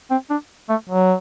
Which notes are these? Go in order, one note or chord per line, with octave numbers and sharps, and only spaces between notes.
C4
D4
A3
F#3